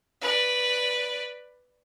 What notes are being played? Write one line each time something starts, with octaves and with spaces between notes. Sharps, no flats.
B4 D5